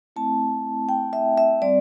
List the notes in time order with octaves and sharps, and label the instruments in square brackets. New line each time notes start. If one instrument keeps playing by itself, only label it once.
[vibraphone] A3 C4 E4 A5
G5
E5
E5
G3 C4 D5